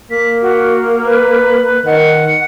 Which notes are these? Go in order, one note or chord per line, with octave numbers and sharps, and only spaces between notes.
A#3 B6
F#4
B4
D#3 F#5